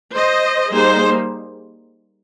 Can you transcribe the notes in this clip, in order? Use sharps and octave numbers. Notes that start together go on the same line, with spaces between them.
C5 D#5
G3 A#3 D#4 G#4 C5